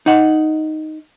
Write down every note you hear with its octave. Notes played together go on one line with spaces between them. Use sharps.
D#4 F#5